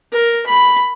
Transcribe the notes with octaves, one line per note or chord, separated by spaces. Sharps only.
A#4
B5